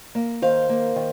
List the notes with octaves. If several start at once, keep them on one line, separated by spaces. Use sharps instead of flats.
A#3
D#3 C5 F5
A#3
D#3